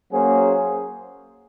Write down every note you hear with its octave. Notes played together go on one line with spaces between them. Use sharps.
F#3 A#3 C#4 G#4 C5